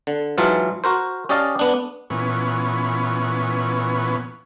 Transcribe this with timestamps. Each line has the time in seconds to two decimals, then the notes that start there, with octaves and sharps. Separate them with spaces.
0.07 D3
0.38 G#2 E3 F#3 F4 F5 A5
0.84 F#4 A#4 C5
1.29 C#4 G4 D5 D#5 F5 A5
1.59 B3 D4
2.10 A#2 E3 B3 C#4